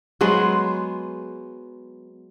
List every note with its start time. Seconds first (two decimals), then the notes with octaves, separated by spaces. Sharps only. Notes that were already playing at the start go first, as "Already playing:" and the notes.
0.21 F#3 G#3 B3 C5